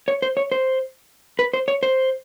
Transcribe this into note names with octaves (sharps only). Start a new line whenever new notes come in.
C#5
C5
C#5
C5
B4
C5
C#5
C5